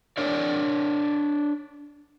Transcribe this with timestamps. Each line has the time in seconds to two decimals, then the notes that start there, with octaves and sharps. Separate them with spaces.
0.17 D4 A#4 C#5 D5